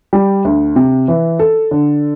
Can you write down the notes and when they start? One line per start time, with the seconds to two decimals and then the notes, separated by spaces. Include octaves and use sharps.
0.13 G3
0.45 D2
0.76 C3
1.08 E3
1.39 A4
1.71 D3